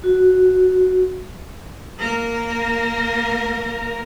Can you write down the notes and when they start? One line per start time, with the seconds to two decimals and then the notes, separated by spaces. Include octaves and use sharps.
0.04 F#4
1.99 A#3 A#4